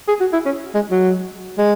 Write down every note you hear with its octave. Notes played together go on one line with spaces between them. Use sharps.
G#4
F#4
E4
C#4
G#3
F#3
G#3